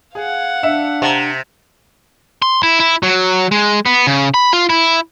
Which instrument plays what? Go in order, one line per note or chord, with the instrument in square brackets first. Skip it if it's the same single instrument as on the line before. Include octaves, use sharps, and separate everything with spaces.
[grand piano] G#4 [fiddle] F5 F#5
[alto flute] D4 [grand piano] E5 C#7 E7
[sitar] C3 [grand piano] F#5 A5 A#5
[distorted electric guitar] C6
E4
E4
F#3
G#3
B3
C#3
B5
F4
E4